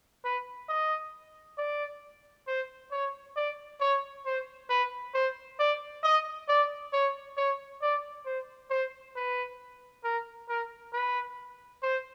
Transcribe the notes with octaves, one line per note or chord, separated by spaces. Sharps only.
B4
D#5
D5
C5
C#5
D5
C#5
C5
B4
C5
D5
D#5
D5
C#5
C#5
D5
C5
C5
B4
A#4
A#4
B4
C5